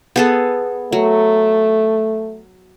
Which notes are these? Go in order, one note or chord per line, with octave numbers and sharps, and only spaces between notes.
B3 G#4 A4
F#3 A3